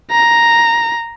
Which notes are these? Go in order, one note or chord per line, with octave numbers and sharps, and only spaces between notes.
A#5